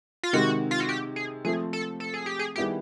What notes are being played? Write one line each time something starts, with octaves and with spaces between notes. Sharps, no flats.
F4
C3 D#3 G#3 F#4
F4
F#4
G4
G#4
F3 A3 C4 G#4
A4
A4
G#4
G4
G#4
D#3 G3 B3 E4 G4 G#4